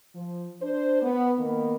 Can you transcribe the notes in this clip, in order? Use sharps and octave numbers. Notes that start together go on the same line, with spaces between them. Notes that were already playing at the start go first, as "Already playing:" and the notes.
F3
D4 C5
B3
D#3 A#3 B3